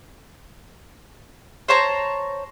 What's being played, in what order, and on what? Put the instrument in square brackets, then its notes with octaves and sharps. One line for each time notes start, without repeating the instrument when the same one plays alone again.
[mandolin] C5 C#5 A5 A#5